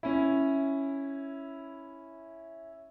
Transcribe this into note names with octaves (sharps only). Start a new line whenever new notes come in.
C#4 E4